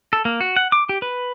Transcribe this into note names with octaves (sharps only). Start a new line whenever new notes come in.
A4
A#3
F#4
F#5
D6
G4
B4